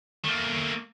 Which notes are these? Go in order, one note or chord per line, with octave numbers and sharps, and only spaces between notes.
A3 A#3